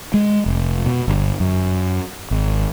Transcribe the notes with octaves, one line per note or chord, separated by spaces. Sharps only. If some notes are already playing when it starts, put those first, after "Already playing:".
G#3
F1
B2
G1
F#2
G#1